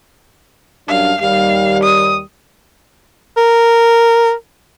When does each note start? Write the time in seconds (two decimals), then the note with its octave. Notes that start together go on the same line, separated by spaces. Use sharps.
0.88 F#2 G3 D4 F5
1.21 D#2 G3 F5
1.83 D#6
3.37 A#4